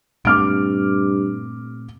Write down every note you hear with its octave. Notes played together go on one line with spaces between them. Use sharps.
G2 A#2 A3 C4 D6 F6 D7